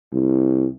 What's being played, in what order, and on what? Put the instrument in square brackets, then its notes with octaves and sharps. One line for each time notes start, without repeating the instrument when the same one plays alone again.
[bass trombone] C2